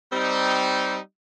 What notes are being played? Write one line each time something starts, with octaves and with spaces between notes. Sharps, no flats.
G3 C4 D#4